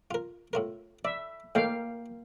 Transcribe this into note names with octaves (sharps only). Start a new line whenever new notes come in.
F4 A#4
A2 F4 A#4
D5 E5
A2 D#3 A3 A#3 F5 G5